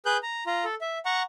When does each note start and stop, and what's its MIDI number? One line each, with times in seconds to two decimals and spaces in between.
0.06 0.17 68
0.06 0.17 71
0.06 0.17 90
0.06 0.17 91
0.23 0.44 82
0.46 0.64 65
0.46 0.64 82
0.64 0.75 69
0.81 0.98 76
1.05 1.22 78
1.05 1.22 82
1.05 1.22 85